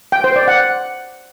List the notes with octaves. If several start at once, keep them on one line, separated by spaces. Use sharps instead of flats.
G5
C5
D5
F#5